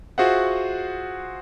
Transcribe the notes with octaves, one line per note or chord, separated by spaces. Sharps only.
F4 F#4 G#4 C5 E5 F#5